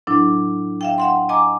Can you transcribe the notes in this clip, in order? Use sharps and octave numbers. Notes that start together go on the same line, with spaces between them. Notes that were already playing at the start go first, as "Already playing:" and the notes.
A2 F#3 D4 E4
E5 F5 G5
E5 F#5 C6
D#5 G#5 A#5 D6